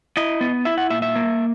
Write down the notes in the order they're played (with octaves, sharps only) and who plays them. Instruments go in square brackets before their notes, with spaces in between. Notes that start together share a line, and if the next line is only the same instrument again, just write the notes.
[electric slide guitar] E4 D#5
B3
E4 E5
F#5
A#2 E5
E5
A#3